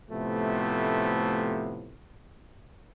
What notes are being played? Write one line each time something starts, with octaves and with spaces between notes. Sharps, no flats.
A2 C3 F3 A3 B3